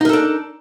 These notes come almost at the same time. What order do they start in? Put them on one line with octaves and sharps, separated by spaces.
D#4 A#4 A4 D4